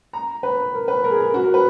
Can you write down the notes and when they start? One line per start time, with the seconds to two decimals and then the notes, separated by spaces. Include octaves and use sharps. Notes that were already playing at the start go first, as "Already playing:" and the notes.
0.13 A#5
0.43 B4
0.74 A#4
0.88 B4
1.04 A#4
1.11 G#4
1.20 A#4
1.34 F#4
1.44 A#4
1.54 B4